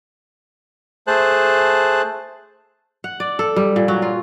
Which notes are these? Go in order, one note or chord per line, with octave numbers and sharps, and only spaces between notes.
A3 G#4 C5 A5 F#6
F#5
D5
A4
G3
A#2
F#3
F4